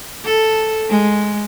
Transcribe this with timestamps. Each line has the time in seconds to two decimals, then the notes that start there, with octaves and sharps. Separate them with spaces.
0.25 A4
0.89 G#3